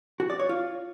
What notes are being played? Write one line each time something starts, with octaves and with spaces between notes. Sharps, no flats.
F#4
D5
C#5
F4